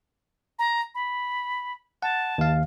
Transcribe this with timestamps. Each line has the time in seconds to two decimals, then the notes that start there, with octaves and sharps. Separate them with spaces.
0.59 A#5
0.95 B5
2.02 F#5 A5
2.38 D#2 F5